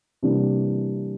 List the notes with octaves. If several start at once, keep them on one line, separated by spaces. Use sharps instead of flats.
C3 E3 G3 A#3 D4